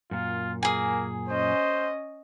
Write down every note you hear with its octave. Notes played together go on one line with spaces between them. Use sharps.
F#2 A#2 F4
A#3 G#4 G#5
C#4 C5 D#5